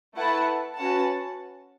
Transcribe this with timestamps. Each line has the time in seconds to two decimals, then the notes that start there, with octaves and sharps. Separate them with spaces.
0.16 A3 E4 B4 F#5 A5
0.77 C#4 F#4 B4 F#5 A5